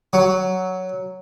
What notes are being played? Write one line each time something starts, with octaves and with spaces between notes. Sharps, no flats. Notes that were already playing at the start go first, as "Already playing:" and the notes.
F#3